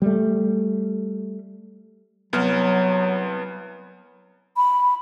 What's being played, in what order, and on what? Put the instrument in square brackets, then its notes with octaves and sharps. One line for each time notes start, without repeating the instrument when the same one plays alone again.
[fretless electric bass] G3 A3
[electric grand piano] C2 B3 F6 [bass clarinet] F#3
[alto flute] B5